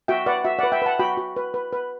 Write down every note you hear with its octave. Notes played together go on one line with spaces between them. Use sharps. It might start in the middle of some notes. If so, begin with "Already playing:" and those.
F#4 E5 G5
B4 D5 F#5
F#4 E5
D5 F#5
B4
E5 G5
B4 F#5 A5
F#4 G5 B5
F#4
B4
B4
B4